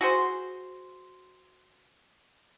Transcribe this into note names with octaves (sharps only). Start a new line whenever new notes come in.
F#4 G#4 C5